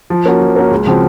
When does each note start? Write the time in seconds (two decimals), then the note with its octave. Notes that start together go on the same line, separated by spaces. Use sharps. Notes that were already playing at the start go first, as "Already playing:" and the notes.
0.10 F3
0.26 A#3 C#4 F#4
0.41 F3
0.56 A#3 C#4 F#4
0.71 C#2
0.87 C#3 F3 C4 F#4